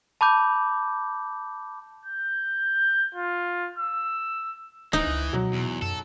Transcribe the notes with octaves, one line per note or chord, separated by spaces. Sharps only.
A5 B5 D6 G6
G6
F4
E6
D1 E3 D#4
C#2
B2 F#3
E2
F#2 A4